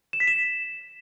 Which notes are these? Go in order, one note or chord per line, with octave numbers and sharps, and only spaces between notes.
E7
B6
E7